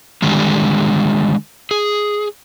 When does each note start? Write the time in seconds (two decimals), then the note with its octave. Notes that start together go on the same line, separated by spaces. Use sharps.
0.22 D3 D#3 G3 G#3
1.71 G#4